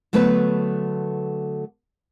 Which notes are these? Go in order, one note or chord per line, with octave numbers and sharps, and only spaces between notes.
D3 F#3 A3 B3 B4